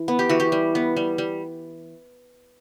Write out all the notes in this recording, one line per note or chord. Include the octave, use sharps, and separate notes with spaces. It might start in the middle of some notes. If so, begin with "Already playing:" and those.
Already playing: E3
B3
G4
E3 F#4
G4
G3
B3
G3
G3